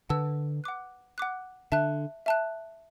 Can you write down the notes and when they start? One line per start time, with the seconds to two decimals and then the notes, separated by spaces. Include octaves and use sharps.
0.09 D3 B4 F#5 A5 E6
0.64 F#5 D6 F#6
1.18 F#5 D6 F#6
1.72 D3 E5 A5 F#6
2.26 E5 A5 F#6